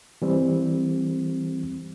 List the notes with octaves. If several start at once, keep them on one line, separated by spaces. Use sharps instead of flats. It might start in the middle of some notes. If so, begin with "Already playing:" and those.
E3 G3 C4